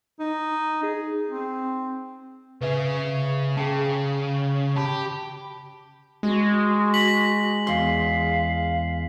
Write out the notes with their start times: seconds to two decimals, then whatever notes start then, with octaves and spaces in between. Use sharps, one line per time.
0.20 D#4
0.83 G#4
1.30 C4
2.61 C#3 G#4 B4 E5
3.57 C#3 G#4 G5 A5
4.76 G4 A5 B5
6.23 G#3 F#4
6.94 B6 F#7
7.67 E2 F5 C6